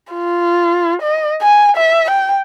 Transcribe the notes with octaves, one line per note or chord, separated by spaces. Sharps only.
F4
D#5
G#5
E5
G5